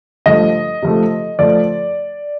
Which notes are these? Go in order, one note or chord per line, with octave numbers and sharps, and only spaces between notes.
G2 F3 A3 D#5
C3 F3 A3
F3 A3 D5